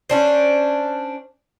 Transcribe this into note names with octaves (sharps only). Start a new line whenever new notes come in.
C#4 D4 C5